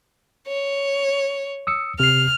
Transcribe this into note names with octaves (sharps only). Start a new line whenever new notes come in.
C#5
D#6 E6 C#7
C3 F6 C7